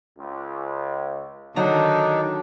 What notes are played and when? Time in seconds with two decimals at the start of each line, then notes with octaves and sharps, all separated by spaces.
0.19 C#2
1.56 D3 D#3 F#3 D4 D#4 A#5